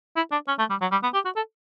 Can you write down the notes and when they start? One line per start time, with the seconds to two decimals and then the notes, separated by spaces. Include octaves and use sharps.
0.16 E4
0.32 D4
0.48 C#4
0.59 A3
0.70 G3
0.81 F#3
0.91 G3
1.03 B3
1.14 G4
1.25 F#4
1.36 A4